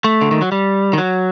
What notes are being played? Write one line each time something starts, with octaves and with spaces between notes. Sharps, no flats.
A3
D3
D#3
F#3
G3
D#3
F#3